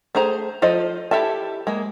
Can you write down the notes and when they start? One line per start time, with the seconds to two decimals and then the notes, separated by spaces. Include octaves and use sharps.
0.15 A3 G#4 C5 A#5
0.62 F3 F4 A4 C5 D#5
1.11 E4 G4 A4 E5 A5
1.67 G#3 A#3